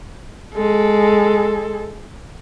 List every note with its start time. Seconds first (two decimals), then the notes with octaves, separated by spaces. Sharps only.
0.54 G#3 A4